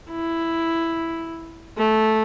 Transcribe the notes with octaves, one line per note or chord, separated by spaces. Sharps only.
E4
A3